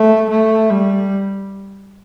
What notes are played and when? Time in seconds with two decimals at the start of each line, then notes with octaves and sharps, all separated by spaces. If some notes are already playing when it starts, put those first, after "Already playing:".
Already playing: A3
0.30 A3
0.70 G3